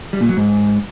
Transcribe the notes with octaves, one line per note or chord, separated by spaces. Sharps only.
G3
A#2
F#3
G#2